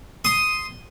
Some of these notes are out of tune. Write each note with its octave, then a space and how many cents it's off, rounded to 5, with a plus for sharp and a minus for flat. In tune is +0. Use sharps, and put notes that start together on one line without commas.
C6 +0 D#6 +0